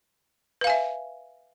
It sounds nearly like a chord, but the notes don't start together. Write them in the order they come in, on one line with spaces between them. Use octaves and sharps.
B4 F5 G#5 E5